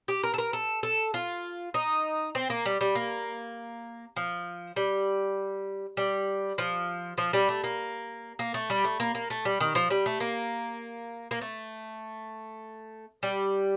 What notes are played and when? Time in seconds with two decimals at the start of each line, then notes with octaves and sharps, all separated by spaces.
0.08 G4
0.23 A#4
0.34 A4
0.38 A#4
0.53 A4
0.83 A4
1.14 F4
1.74 D#4
2.35 C4
2.50 A#3
2.66 G3
2.81 G3
2.95 A#3
4.16 F3
4.76 G3
5.97 G3
6.58 F3
7.18 F3
7.33 G3
7.49 A3
7.64 A#3
8.39 A#3
8.54 A3
8.70 G3
8.84 A3
9.00 A#3
9.15 A#3
9.30 A3
9.45 G3
9.60 D#3
9.75 F3
9.90 G3
10.06 A3
10.20 A#3
11.31 A#3
11.41 A3
13.23 G3